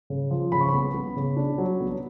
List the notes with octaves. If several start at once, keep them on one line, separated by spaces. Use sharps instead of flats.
C#3
F3
C#3 B5
C#6
B3 B5
B3
C#3
D4
F#3
B3